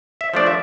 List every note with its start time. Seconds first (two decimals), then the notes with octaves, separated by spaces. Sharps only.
0.21 E5
0.34 F3 A3 D4 D5
0.47 E5